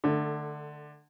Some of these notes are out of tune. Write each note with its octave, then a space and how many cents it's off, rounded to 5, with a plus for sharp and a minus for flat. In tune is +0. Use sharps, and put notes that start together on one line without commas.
D3 +20 A3 +0